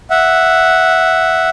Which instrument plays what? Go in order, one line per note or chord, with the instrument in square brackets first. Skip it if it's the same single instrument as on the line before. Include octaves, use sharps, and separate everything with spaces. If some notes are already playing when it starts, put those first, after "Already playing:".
[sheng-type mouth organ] E5 F#5